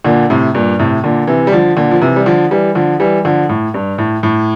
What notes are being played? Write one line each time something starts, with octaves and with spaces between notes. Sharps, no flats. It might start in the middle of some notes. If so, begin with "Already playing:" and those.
A#2 D3
A2 C3
G2 A#2
A2 C3
A#2 D3
C3 E3
G3
D3 F3
A#2 D3
F3
C3 E3
G3
D3 F3
E3 G3
D3 F3
E3 G3
D3 F3
A2
G2
A2
A2